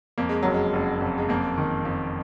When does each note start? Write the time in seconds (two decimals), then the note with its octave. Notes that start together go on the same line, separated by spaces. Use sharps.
0.18 F2 A#3
0.29 G#3
0.43 F#1 F#3
0.54 G#3
0.73 F#1
1.01 F2
1.18 G#3
1.29 F2 A#3
1.58 D#3
1.85 F2